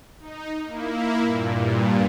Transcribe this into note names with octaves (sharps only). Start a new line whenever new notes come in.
D#4
A#3 E4
G2 A#2